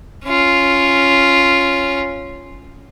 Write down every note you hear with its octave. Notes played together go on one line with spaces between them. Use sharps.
C#4 F4